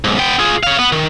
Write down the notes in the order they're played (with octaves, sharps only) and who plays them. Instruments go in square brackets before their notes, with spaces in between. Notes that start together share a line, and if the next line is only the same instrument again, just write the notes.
[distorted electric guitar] B1 G#2
B3 G5
F4 G#4
C#5 F5
B3
D#3